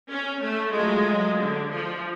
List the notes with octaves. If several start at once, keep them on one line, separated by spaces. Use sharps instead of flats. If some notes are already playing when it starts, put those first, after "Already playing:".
C#4
A3
F#3 G#3 A3 F4
D3
F3